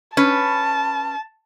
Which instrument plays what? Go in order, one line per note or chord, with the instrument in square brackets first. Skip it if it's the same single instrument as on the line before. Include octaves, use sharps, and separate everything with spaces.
[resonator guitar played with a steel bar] C#4 B4 [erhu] A5